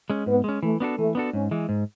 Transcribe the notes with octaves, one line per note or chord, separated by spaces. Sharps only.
G#3 C#4
G#2 B3
G#3 C#4
E3 A3
B3 D4 F#4 A4
E3 A3
B3 D4 F#4 A4
G#2 C#4
E3 G#3
G#2